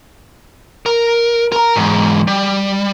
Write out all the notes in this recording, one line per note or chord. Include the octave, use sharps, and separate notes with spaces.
A#4
A#4 A#5
E2 G#2
G3